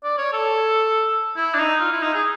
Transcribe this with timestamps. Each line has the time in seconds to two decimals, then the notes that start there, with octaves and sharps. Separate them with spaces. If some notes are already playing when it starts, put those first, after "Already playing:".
0.04 D5
0.18 C#5
0.33 A4
1.37 E4
1.54 D4
1.59 D#4
1.80 F4
1.92 E4
2.03 D#4
2.14 G#4